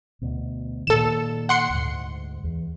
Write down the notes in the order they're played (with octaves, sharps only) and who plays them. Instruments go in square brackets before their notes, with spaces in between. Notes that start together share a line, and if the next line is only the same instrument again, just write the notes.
[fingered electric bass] D2 B2
[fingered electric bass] A#2 D#3 [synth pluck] A4 E7
[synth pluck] F#5 C6 C#7
[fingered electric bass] D2 G#2
E2